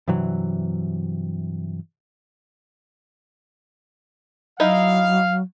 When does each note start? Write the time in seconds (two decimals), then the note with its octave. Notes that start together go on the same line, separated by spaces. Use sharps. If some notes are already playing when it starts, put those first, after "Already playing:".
0.08 G2 C3 E3 F#3
4.60 F#3 D#4 E4 F5